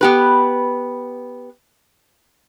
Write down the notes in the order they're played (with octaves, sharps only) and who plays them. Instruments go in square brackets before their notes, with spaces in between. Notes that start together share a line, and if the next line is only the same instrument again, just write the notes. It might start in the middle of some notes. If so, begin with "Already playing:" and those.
[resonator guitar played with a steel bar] B3 G4 B4